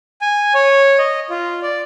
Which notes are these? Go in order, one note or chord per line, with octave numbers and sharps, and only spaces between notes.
G#5
C#5
D#5
F4
D5